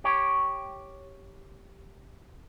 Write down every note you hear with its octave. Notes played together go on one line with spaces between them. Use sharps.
G4 C#5